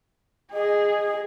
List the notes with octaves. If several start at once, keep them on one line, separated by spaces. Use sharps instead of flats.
G#4 D#5